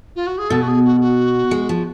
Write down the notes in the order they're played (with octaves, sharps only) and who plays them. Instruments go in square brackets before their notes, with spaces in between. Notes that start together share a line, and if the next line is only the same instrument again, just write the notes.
[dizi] F4
F#4
G#4
[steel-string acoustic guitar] B2 [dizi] A4
[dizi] F#4
G#4
F#4
F#4
[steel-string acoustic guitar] G#3
F3